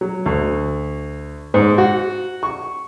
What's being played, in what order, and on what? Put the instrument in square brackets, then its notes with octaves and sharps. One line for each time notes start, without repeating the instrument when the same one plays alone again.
[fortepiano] F#3
D2
G#2
F#4
C#6